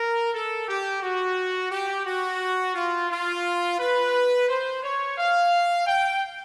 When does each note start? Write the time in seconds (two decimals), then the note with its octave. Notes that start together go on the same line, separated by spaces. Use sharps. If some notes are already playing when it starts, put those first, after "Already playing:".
Already playing: A#4
0.32 A4
0.67 G4
1.02 F#4
1.71 G4
2.05 F#4
2.75 F4
3.10 F4
3.79 B4
4.48 C5
4.83 C#5
5.17 F5
5.86 G5